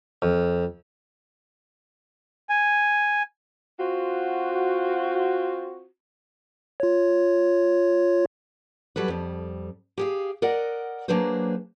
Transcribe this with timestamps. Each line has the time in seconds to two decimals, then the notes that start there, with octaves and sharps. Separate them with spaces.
0.22 F2
2.49 G#5
3.80 C4 F4 F#4
6.80 F4 C#5
8.96 F#3 G3 A4 B4
9.08 F2 G3
9.98 G4 G#4 F5
10.42 A#4 D5 D#5 F#5
11.08 F#3 A#3 D4 G#4 B4 C5